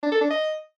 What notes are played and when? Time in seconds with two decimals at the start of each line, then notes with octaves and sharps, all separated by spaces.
0.03 D4
0.12 A4
0.21 D4
0.30 D#5